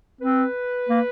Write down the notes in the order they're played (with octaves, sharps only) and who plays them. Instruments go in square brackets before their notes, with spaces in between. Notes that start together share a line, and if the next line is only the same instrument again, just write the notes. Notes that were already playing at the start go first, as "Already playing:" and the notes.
[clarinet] C4 [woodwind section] B4
[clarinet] A#3